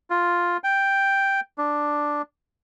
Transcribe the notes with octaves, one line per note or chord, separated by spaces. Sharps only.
F4
G5
D4